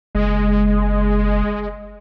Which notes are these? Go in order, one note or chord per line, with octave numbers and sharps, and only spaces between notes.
F#1 G#3